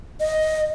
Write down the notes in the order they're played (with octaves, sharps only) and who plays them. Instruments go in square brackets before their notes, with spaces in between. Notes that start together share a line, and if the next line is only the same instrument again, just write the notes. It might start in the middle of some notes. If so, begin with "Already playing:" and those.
[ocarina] D#5